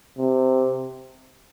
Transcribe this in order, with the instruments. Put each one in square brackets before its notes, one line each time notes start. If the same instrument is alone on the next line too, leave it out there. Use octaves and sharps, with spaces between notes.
[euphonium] C3